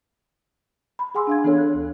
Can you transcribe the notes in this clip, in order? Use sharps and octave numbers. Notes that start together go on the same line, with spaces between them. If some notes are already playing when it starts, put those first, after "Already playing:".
B5
G#4 F#5 G#5 C6 D6 E6
D4 F5 G#6
E3 B3 D4 A4 C#5
F#6
D2